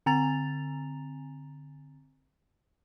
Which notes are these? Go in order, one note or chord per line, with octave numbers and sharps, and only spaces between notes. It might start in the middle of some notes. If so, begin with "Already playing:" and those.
D3 C4 G#5 A#5 A6 F7